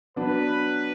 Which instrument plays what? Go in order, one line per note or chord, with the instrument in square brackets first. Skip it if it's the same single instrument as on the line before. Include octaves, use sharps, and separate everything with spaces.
[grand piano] F#3 B3 D4 [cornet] B4